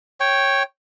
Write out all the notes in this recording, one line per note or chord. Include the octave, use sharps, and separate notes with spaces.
C#5 G5